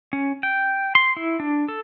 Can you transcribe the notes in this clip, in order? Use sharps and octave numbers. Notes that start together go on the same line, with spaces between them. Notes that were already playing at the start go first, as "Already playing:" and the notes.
C#4
G5
C6
E4
D4
A4